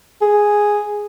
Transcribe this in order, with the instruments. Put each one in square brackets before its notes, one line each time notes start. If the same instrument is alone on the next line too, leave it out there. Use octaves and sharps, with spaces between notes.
[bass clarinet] G#4